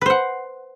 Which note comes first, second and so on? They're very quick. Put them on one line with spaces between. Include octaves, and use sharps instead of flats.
B4 C5 F#5